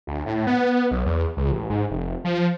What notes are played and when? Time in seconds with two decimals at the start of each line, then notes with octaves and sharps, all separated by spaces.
0.07 D2
0.26 A2
0.47 B3
0.91 B1
1.06 E2
1.37 C#2
1.52 A1
1.70 G#2
1.90 F1
2.24 F3